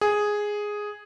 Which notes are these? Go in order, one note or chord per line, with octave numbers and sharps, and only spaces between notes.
G#4